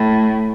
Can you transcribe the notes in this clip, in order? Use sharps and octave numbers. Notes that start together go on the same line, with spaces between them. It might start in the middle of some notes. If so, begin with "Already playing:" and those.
Already playing: A2